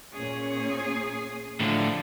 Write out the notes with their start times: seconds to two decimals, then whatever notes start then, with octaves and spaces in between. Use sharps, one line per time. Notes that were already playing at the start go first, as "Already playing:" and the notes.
0.13 A#2 C#4 G#4 C#5
1.60 A2 D3 F3 D4